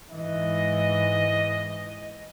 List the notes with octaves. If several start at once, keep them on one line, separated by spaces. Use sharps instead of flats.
G#2 E3 D#5